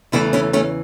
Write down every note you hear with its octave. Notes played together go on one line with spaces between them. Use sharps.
E2 C#3 E3 A3 C#4 E4
C#4 E4
A3 C#4